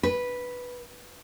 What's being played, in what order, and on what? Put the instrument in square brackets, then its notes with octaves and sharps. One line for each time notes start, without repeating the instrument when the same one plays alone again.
[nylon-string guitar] B4